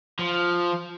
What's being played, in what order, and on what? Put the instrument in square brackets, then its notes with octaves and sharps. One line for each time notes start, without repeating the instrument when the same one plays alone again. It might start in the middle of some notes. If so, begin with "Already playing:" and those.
[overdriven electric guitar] F3